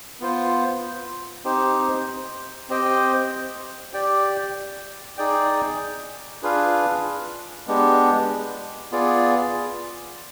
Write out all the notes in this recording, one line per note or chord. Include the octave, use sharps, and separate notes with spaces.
B3 F4 C5
C4 D#4 G4 C5
C4 G4 C5 D#5 G5
G4 D5 G5
D#4 G#4 D5 G5
D4 F4 G#4 B4 F5
G#3 B3 D4 G4
B3 F4 G#4 D5